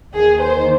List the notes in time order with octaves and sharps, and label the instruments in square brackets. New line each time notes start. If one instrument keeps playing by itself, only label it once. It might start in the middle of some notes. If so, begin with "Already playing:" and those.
[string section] D#2 D#3 A#3 G#4
C5